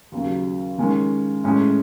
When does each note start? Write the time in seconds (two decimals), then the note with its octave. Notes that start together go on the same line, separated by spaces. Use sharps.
0.12 D#2 C#3 F#3
0.78 D#3 G#3 C#4
1.44 A2 G#3 C#4 G#4